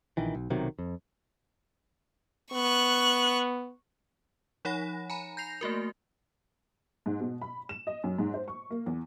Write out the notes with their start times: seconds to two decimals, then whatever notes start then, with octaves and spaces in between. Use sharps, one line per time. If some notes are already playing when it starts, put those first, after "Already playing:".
0.17 A#1 D#3 E3
0.35 B1
0.50 B1 C3 D#3 F#3
0.79 F2
2.53 B3 C#6 F#6
4.65 F3 D#4 C#5 F#5 B5 A#6
5.10 G#5 A#5 B5
5.37 G6 A#6 C7 F7
5.61 A3 A#3 F#4 A#4
7.06 G#2
7.20 B2
7.42 B5
7.69 E7
7.87 D#5
8.04 F#2
8.18 G#2
8.34 C5
8.48 C#6
8.71 A#3
8.86 E2